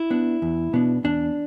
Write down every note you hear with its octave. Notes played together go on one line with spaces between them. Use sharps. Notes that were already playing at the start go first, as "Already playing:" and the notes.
Already playing: E4
B3 D4
E2
B2 B3 D4
E2 D4